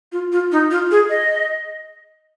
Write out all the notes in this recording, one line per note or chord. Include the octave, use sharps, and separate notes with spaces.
F4
F4
D#4
F4
G#4
D#5